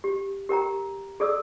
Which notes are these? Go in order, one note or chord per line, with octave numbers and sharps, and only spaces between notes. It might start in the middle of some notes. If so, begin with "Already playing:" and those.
G4
G4 A#4 G5 A#5
G#4 A4 D5 D#6 E6